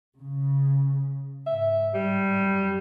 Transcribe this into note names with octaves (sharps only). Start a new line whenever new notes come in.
C#3
G#2 E5
G3
F#2